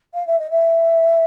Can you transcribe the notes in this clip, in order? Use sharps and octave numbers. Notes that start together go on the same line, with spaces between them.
F5
E5
D#5
E5